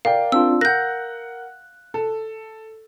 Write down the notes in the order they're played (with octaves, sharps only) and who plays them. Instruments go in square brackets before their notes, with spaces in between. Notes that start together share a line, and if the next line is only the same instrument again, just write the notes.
[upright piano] A#4 D5 G5 [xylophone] F5
[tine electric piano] C4 D4 F4 [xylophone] E6
[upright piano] A#4 F#5 [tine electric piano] F#6 [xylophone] G6 A#6
[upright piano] A4